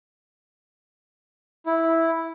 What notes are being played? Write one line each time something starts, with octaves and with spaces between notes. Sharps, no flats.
E4